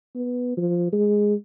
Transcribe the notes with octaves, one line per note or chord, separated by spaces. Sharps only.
B3
F3
G#3